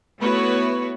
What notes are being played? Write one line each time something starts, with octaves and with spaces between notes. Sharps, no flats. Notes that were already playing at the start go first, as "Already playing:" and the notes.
A3 B3 E4 F#4 B4 C#5